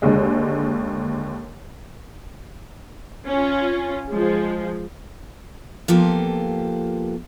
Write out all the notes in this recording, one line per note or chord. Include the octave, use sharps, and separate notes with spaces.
D#2 D3 G#3
C#4 F4
F3 G#3
F3 A#3 B3 F4 G4 A4